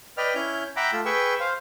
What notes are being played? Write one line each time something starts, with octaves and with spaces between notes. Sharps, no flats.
B4 D5 D#5 G5 F6
C#4 E4 F6 G6
E5 F#5 G5 A#5 B5 D6
A3 F4 E6
G#4 B4 G5 C#6 E6
C5 F5